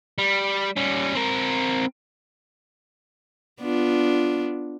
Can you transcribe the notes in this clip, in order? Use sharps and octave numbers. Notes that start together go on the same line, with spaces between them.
G3
G3 C#4
C4 A#4
B3 D4 F4